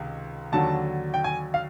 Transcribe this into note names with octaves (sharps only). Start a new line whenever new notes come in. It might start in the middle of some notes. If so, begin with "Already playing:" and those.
Already playing: C#2 C3 D#3
D#2 D3 F#3 A5
G5
G#5
F5